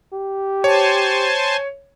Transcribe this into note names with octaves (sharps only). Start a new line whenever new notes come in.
G4
C5 C#5 G#5 A5